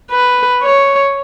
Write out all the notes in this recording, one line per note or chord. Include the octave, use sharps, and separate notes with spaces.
B4
C#5